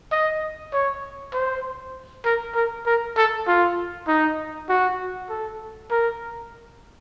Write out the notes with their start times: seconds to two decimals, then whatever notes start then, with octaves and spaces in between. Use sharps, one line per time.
0.11 D#5
0.73 C#5
1.33 C5
2.25 A#4
2.55 A#4
2.86 A#4
3.17 A4
3.47 F4
4.08 D#4
4.69 F#4
5.29 A4
5.91 A#4